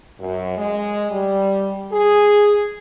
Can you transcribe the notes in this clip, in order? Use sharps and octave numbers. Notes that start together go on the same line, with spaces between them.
F#2
G#3
G3
G#4